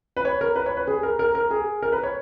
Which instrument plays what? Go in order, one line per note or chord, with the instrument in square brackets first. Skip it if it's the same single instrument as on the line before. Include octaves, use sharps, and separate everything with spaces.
[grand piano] B4
C#5
A#4
B4
C#5
B4
G#4
A#4
A#4
A#4
G#4
A#4
B4
C#5